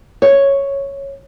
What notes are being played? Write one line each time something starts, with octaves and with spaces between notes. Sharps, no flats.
C#5